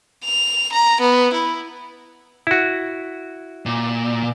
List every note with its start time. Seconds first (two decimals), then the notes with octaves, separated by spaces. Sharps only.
0.25 F7
0.72 A#5
1.01 B3
1.33 E4
2.47 E4 F#4
3.66 A#2